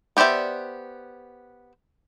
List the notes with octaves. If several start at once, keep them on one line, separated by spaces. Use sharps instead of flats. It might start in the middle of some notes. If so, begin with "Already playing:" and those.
B3 G4 C5 D5 E5